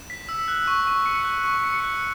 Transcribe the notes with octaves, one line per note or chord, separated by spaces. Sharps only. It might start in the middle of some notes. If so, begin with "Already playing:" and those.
Already playing: E7
B6
E6
F#6
C#6
C#6
C#7
F#6
C#6
C#7
F#6